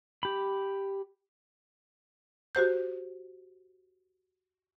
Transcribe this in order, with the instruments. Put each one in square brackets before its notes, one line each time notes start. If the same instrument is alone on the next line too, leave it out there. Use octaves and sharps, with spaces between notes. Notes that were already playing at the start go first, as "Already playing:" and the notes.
[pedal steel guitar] G4 B5
[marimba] F#4 G4 C5 G6